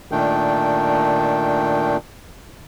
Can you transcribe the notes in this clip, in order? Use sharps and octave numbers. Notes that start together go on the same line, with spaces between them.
A#2 D#3 A3 D4 G5